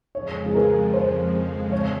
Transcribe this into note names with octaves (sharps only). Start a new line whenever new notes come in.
F2 C#3 F3 G#3 C#5
G#4
A#4
C5
C#5